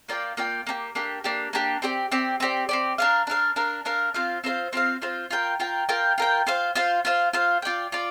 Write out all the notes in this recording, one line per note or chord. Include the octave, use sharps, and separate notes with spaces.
A#3 F4 D5 G5
A#3 F4 D5 G5
A#3 D4 G4
A#3 D4 G4
A#3 D4 G4
A#3 D4 G4
C4 G4 D5
C4 G4 D5
C4 G4 D5
C4 G4 D5
D4 A#4 F5
D4 A#4 F5
D4 A#4 F5
D4 A#4 F5
C4 F4 C5 F5
C4 F4 C5 F5
C4 F4 C5 F5
C4 F4 C5 F5
F4 A#4 G5
F4 A#4 G5
F4 A#4 G5
F4 A#4 G5
F4 C5 F5
F4 C5 F5
F4 C5 F5
F4 C5 F5
F4 D5 G5
F4 D5